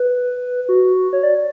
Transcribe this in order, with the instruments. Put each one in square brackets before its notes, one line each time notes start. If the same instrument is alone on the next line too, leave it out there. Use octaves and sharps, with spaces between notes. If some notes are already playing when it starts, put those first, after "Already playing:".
Already playing: [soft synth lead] B4
F#4
C#5
D5